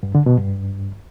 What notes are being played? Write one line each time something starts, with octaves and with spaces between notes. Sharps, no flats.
G2
D3
B2
G2